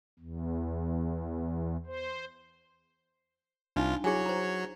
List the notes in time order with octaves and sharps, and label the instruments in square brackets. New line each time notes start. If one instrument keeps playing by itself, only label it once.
[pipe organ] E2
C5
[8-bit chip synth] C2 F4 [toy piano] D4 D#4
[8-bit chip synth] F#3 C#5 [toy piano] E4 G#4 G#5
[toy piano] C5 A#5